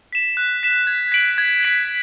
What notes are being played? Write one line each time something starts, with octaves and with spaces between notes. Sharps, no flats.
B6 E7
F#6
B6 E7
G#6
B6 D7 F#7
G#6
B6 D7 F#7